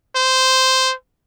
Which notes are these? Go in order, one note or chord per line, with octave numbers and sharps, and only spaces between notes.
C5